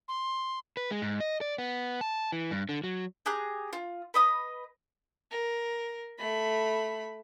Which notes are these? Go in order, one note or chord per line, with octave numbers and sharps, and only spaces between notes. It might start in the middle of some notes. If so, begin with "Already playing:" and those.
C6
B4
G#3
G#2
D#5
D5
B3
A5
E3
G2
D3
F#3
G4 G#4 A#5 F#6
F4
B4 D#5 D#6
A#4
A3 B5